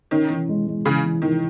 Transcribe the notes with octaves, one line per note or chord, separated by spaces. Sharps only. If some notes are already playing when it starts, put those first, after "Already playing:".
D#3 C#4
E3
G#3
G#3
C#3 E3
E3
D#3 E3